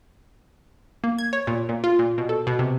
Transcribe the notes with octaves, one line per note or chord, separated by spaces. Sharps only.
A#3
G#6
C#5
A#2
A#2
F4
A#2
B2
A4
B2
C3